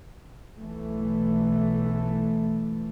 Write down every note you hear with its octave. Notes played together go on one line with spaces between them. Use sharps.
B1 E3 A3